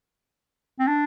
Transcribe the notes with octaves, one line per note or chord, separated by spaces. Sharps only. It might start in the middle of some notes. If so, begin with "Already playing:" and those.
C4
D4